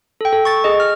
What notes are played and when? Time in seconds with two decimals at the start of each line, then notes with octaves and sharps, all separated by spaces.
0.21 A4 G5
0.33 A4
0.45 C#6 A6
0.64 G#4 D#5
0.80 F6